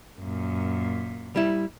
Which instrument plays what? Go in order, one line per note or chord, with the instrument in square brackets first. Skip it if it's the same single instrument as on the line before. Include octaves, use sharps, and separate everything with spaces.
[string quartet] F#2 A#2
[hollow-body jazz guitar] G3 E4